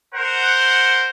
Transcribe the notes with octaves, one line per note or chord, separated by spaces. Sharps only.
A#4 C5 F#5